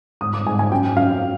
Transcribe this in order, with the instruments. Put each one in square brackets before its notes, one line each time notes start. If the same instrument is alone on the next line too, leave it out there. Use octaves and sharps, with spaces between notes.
[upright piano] G#2 D#6
D6
G#2 G#5
G#5
F#2 G5
F#2 F5